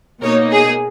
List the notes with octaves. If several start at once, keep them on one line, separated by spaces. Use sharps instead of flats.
B2 A#3 D#4 A#4 C#5
G#4